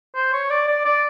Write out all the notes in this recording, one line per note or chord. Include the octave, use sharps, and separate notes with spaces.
C5
C#5
D5
D5
D5